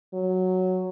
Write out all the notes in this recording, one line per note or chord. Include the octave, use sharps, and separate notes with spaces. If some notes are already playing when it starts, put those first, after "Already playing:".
F#3